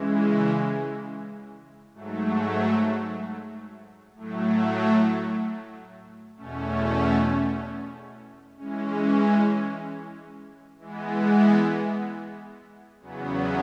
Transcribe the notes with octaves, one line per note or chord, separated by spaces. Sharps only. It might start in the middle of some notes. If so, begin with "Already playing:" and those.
Already playing: C#3 E3 G#3
G#2 F#3 A3
A2 F#3 A3
E2 B2 A3 C#4
E3 G#3 C#4
E3 G#3 B3
E2 C#3 F#3 B3